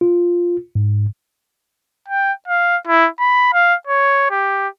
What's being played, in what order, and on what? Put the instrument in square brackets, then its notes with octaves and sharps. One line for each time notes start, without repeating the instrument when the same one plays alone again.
[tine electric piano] F4
G#2
[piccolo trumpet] G5
F5
E4
B5
F5
C#5
G4